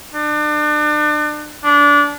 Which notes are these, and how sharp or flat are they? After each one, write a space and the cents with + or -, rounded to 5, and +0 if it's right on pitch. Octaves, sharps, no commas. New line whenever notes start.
D4 +35
D4 -20